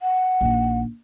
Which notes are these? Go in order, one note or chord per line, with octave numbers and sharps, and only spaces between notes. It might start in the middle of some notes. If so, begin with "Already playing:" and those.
F#5
A#1 D#3